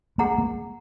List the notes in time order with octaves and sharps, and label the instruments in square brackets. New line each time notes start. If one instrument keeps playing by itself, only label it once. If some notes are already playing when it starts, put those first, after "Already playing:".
[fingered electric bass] A#3 [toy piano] G#4 F#5 A#5
[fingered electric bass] A#3